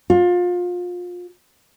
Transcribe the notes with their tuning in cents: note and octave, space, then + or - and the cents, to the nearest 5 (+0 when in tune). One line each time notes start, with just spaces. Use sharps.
F4 +30